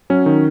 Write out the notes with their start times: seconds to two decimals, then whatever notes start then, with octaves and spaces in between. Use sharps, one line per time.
0.10 F#3 C#4
0.26 D#3